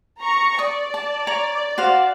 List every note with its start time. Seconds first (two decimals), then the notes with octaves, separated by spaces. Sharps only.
0.19 A#5 C#6
0.59 D5 D#6
0.94 A5
1.27 C#5 A#5
1.78 F#4 C5 F5